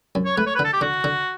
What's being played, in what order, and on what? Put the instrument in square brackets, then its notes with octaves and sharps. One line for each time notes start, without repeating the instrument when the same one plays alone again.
[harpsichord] F#2
[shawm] C#5
[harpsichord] A3 [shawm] B4
[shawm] C#5
B4
[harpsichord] D3
[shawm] A4
G4
[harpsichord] D3 [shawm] F#4
[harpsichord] D3